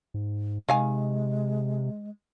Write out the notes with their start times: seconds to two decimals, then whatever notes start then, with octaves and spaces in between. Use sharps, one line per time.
0.14 G#2
0.69 C3 D#3 G#3 F5 G#5